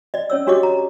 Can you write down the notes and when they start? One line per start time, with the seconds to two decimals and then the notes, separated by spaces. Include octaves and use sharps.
0.14 D5 D#5
0.30 C#4 C#5 E6
0.47 D4 F#4 G4 C#5 D#5 D6
0.63 A#5